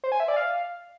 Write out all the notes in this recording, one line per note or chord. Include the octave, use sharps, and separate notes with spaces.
C5
G#5
E5
D5
F5